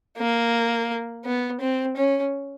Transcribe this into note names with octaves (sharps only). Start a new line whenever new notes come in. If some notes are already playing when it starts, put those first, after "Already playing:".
A#3
B3
C4
C#4